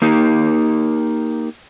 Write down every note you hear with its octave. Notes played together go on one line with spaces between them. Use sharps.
A#3 D#4 G4